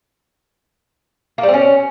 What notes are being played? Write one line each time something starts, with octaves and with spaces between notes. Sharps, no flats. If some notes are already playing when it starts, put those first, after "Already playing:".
A#3
G3
C4
C#4